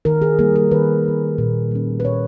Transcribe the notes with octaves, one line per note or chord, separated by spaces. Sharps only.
D#3 A#4
G#4
G3 A#3 G#4
A#4
D#3 B4
G3 A#3
A#2
G3 C#4
B4
A#2 C#5